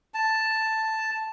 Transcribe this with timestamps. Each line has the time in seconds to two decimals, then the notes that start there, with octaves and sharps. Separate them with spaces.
0.14 A5